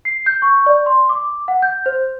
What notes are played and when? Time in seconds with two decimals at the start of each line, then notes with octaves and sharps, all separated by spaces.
0.05 C7
0.26 G6
0.42 C#6
0.66 D5
0.86 C6
1.09 D6
1.48 F#5
1.62 G6
1.86 C5